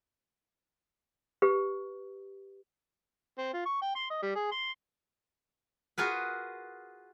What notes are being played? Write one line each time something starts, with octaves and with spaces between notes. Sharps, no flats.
G4 B4
C4
F4
C#6
G5
C6
D#5
G3
G#4
C6
F4 F#4 G#4 A#4 B4